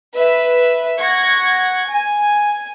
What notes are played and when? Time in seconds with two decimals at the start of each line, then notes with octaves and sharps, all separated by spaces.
0.14 B4 E5
1.00 F#5 C#6 G#6 A#6
1.89 G#5